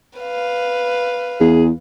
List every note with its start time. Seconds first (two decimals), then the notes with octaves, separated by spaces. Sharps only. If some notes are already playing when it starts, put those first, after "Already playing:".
0.19 B4 F5
1.41 E2 G#4